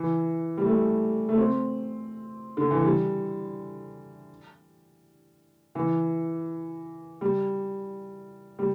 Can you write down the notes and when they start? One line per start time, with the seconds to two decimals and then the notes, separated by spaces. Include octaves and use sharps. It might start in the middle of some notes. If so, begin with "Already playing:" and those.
Already playing: E3
0.58 G3
0.65 A3
1.29 A3
1.38 C4
2.57 D3
2.71 E3
2.84 G3
5.75 E3
7.21 G3
8.59 G3